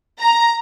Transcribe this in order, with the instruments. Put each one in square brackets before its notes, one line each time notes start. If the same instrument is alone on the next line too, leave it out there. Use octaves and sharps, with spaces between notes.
[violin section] A#5